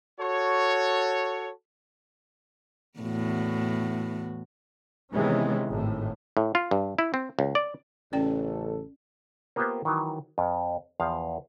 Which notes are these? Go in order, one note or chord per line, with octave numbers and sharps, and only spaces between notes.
F#4 A4 C#5
E2 A2 F#4
C3 D#3 E3 G#3 B3 C#4
G#1 A2
A2
F4
G2
E4
C4
C#2
D5
A1 C#3 C#4 A4 D5 G5
A#3 B3 F4 G4 B4 C5
D#3 E3 F#3
F2
E2 F3 F5